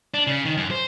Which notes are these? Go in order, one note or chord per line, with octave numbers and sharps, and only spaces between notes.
D4
C#3
D#3
F#2
C5